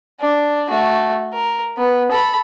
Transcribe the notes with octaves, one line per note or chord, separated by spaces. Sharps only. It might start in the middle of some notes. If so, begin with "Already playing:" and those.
D4
A3 F#4
A#4
B3
A4 B5